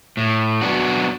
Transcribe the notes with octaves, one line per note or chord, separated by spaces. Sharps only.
A2
F#3 B3 D4 F#4